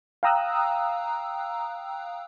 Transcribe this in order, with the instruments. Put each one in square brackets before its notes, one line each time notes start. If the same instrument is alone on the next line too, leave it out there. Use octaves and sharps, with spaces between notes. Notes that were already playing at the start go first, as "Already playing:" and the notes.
[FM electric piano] F5 G5 A#5 D#6 E6 F#6